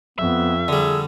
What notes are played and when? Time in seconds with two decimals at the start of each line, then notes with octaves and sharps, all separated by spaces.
0.19 F2 B3 E5
0.68 D3 G3 G#4